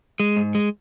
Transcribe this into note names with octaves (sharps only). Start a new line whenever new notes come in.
G#3
G#2
G#3